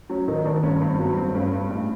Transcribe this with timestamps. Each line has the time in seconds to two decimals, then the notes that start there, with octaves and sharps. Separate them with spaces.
0.10 F#3 C#4
0.28 D#3 D#4
0.45 D#3 D4
0.63 G2 C#4
0.81 G2 C4
0.99 F#3 B3
1.16 G1 C4
1.35 G2 C#4
1.52 G3
1.70 A1